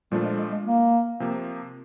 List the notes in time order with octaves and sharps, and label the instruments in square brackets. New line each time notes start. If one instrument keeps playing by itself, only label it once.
[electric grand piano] A#2 F3 A3 D4 F4 [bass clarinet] G3
[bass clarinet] G#3
G#3
G#3
A#3
[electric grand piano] C3 F3 A#3